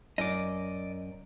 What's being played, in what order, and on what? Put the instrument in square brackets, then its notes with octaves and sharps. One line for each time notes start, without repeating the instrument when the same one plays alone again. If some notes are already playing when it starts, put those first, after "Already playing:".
[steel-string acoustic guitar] F#2 [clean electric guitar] D5 D#5